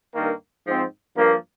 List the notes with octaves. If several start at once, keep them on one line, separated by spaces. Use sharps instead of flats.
G2 D#3 A#3
G#2 F3 C4
G2 F3 A#3